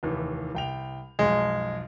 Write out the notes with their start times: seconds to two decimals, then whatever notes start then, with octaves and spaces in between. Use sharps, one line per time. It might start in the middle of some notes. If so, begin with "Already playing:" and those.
0.03 F1 D#2 E3
0.55 C2 G5 F7
1.19 B1 F2 G#3